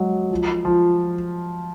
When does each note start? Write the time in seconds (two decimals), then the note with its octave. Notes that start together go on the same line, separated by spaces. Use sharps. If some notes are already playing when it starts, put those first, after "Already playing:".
Already playing: F#3 G#3
0.31 F3
0.65 F3